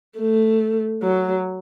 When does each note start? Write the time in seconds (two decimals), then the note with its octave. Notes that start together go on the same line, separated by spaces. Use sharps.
0.18 A3
1.03 F#3